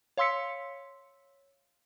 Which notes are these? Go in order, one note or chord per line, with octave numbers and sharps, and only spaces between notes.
C#5 F5 C6 E6 B6 C#7